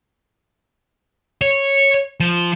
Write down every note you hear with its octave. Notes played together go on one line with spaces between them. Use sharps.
C#5
F3